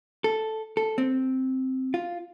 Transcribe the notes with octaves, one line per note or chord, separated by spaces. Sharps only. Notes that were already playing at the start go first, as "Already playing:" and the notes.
A4
A4
C4
F4